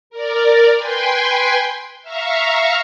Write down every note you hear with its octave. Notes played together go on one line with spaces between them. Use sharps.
A#4 D5
B4 G5 G#5 C6
E5 F5 A#5 C#6